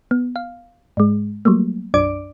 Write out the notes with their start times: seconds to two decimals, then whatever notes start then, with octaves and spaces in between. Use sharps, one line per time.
0.11 B3
0.36 F5
0.97 G#2 G#3
1.45 F#3 G3 A3 A#3
1.94 B1 F#2 D4 D5 D6 D7